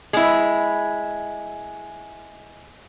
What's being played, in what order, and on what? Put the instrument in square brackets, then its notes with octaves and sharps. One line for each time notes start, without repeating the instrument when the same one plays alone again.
[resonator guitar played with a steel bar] G#3 E4